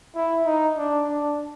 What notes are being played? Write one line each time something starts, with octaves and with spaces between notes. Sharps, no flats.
E4
D#4
D4
D4